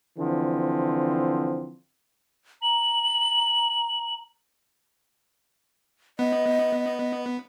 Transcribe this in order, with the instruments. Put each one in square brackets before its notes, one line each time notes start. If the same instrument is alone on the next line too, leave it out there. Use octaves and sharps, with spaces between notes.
[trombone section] D3 E3 F3 C4
[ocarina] A#5 [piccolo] F#7
[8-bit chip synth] B3 [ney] D#5